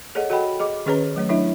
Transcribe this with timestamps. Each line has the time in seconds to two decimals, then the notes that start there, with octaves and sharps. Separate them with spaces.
0.15 G#4 A4 C#5 D#5 F#5
0.30 F#4 A4 D#5 F#5 G5 B5
0.59 G#4 D#5 D6
0.86 D#3 C#4 G#4 B4 C#5 A#5
1.16 F#3 A3 C#5
1.29 F#3 D4 E4 C#5 E5